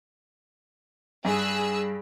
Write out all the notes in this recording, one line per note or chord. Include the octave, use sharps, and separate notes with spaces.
G2 G#4 E6 F#6